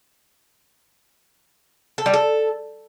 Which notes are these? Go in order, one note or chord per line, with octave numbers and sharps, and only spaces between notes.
A4
G3
A4